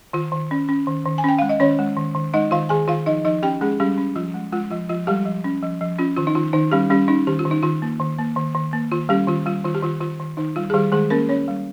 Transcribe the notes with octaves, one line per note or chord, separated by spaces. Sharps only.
D#3 F4
D#3
C#4
C#4
D#3
D#3
G#5
C#4 G5
G#3 F5
D#5
D#3 C#4 C#5
G#3
D#3
D#3
G#3 D#4 D#5
D#3 F4 F5
D#3 G#4 G#5
D#3 F4 F5
F3 D#4 D#5
F3 D#4 D#5
C#4 G4 G5
G#3 C#4 G#4
G3 C#4 G4
C#4
F3 F4
G#3
G#3 F4
F3 F4
F3 F4
G3 G#3 G4
F3
C#4
F3
F3
C#4 F4
D#3 F4
D#4
D#3 F4
D#3 D#4
G3 C#4 G4
G3 C#4 G4
C#4 D#4
D#3 G4
F4
D#3
D#4
D#3 F4
A#3
D#3
A#3
D#3
D#3
A#3
D#3 F4
G3 C#4 G4
D#3 F4
G3 F4
D#3 F4
G4
D#3 F4
D#3 F4
D#3
D#3 D#4
G3 F4
G#4
D#3 G3 G4
D#3 G#3 G#4
A#3 C#4 A#4
C#4 C#5
G3